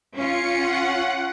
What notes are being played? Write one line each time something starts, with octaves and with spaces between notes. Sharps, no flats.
C#4 F4 C#7
F#5